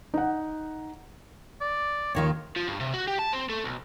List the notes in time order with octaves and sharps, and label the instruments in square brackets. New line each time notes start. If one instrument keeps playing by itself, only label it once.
[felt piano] D#4 F#5
[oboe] D5
[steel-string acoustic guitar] D#2 D#3 F4 [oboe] C#5
[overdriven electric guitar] F3
G2
C3
F#4
G4
A5
C4
A3
B1